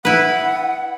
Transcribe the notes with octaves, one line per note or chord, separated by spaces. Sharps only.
E4 B4 F#5